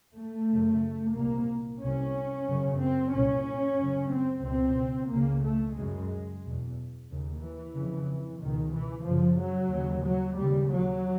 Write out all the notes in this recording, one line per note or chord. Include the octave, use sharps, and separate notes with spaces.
A3
F#2 C#3
C2 A#2 A#3
C2 C3 C#4
F#2 C#3
C4
C2 A#2 C#4
F#2 C#3
C4
C#2 B2 C4
C#2 C#3 A#3
A3
F#2 C#3 G#3
E2 B2
D#2 C#3
E3
F2 C#3
C#2 B2 D#3
E3
F#2 C#3 F3
F#3
D#2 C#3
F#3
D#2 C#3 G3
F#3